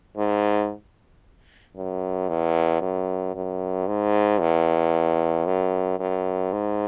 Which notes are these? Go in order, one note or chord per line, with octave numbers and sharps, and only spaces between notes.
G#2
F#2
E2
F#2
F#2
G#2
E2
F#2
F#2
G#2